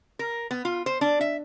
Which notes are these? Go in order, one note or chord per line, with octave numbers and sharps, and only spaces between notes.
A#4
B3
F4
C5
D4
E5